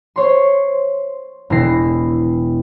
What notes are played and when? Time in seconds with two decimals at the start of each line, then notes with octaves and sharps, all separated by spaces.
0.16 C5 C#5 C6
1.50 E1 B2 E3 A#6 C7